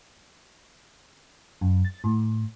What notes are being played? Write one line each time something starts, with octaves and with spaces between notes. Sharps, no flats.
F#2
A6
A2